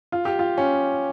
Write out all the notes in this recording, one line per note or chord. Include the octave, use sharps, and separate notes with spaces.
F4
G4
F4
C#4